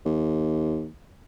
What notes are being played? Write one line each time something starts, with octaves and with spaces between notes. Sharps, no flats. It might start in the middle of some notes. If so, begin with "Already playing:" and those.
D#2